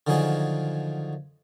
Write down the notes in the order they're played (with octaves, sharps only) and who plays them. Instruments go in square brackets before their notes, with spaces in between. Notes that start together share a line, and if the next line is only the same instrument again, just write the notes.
[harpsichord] D3 D#3 F3 F#3 G#4 D#5